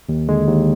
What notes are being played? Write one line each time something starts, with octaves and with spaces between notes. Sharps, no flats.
D#2
D3 G#3
D#2